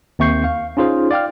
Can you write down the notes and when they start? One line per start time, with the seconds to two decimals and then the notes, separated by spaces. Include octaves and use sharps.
0.19 D#2 C4 E5 C#6 G6 C7
0.44 F5
0.77 C#4 D#4 F4 G#4 C5
1.11 D5 F5 G5 F6